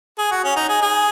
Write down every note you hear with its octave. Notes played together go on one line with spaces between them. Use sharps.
G#4
F#4
C#4
D#4
G#4
G#4